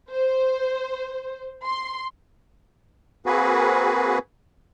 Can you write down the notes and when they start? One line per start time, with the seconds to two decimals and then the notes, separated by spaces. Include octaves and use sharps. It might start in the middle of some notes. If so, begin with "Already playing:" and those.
0.11 C5
1.64 C6
3.26 A#3 C4 F#4 G#4 B4